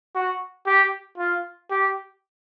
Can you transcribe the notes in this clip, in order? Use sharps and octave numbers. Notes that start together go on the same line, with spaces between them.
F#4
G4
F4
G4